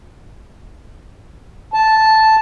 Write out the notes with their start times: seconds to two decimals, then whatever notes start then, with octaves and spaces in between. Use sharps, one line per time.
1.74 A5